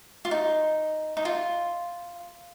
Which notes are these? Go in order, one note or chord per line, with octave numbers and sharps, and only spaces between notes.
F4
D#4
D#4
F4